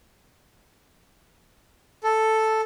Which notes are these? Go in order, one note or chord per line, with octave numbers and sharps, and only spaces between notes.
A4